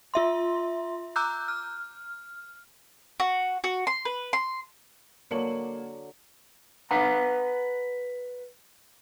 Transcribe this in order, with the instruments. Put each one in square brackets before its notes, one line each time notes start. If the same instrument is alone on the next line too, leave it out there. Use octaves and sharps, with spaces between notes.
[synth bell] F4 E5 C6
A#5 D6 E6 F#6 G6
F6
[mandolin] F#4
F#4
C6
B4
C6
[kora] D3 F#3 E5 [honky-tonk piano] A#3 C#7 F#7
[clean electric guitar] B4 F#5 A#5